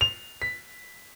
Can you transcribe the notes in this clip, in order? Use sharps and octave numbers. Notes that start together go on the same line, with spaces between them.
F7
B6